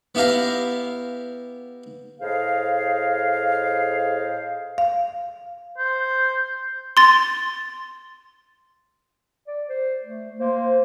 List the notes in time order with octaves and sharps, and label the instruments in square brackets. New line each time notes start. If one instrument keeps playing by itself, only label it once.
[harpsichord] B3 E4 G4 F5 A#5
[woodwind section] A2 G#4 C5 D#5 F5
[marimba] F5
[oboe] C5
[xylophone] C6 A6
[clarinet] D5
C5
A3
[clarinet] A#3 [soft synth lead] C5